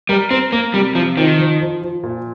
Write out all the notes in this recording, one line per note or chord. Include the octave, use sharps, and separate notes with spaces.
G3 A#4
C4 A#4
A#3 A#4
C3 G3
C3 F3
D#3 F3
F3
F3
F3
A#2